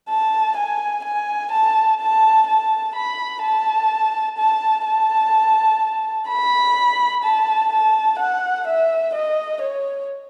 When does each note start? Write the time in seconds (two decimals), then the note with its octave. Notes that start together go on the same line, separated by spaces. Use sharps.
0.09 A5
0.57 G#5
1.04 G#5
1.52 A5
2.00 A5
2.47 A5
2.95 B5
3.43 A5
4.38 A5
4.86 A5
6.29 B5
7.24 A5
7.72 A5
8.19 F#5
8.67 E5
9.15 D#5
9.62 C#5